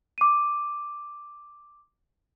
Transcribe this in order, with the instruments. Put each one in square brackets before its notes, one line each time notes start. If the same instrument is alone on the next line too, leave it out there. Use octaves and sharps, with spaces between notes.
[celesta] D6 D#7